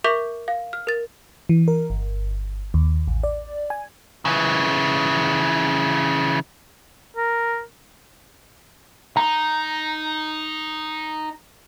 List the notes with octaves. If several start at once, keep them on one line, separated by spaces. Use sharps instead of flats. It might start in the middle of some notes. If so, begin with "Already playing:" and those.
A#4 E5 C#6 D6 G6 B6
F5
F6
A#4 A6
E3
A#4
G1
D#2
A1
D5
G#5
C#3 E3
A#4
D#4 A#5